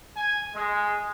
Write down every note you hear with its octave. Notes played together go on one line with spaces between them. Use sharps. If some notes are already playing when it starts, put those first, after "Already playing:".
G#5
G#3